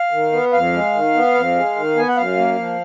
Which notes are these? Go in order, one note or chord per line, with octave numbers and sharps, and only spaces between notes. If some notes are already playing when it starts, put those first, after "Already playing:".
Already playing: F5
D#3
B3
F2 F5
G#3
D#3
B3
F2
G#3
D#3
B3 G#5
F#5
F#2 F5
A#3
F3